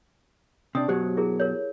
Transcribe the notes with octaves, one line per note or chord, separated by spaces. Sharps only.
C3 D4 D#6
F#2 B2 F#3 G4 C5
E4 G#4 A#4
A#4 C#5